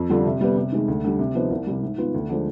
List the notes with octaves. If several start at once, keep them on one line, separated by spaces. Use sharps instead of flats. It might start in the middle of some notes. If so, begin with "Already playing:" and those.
Already playing: F2
D3 G3 D4 F4
C3
G3 B3
C3
D#3 G#3
D2
D3 G3
C3
F3 B3 D#4
C2
C3 G3
G#2
D#3 B3 F4
D2
D3 F3 G#3